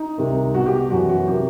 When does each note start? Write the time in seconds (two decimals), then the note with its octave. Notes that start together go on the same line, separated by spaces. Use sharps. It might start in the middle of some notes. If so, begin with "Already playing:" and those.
Already playing: D#4
0.17 C2 C3 D#3
0.54 C2 B2 F#4
0.66 G4
0.90 F#2 E3 F#4
1.09 F#4
1.27 C3 D#3 G4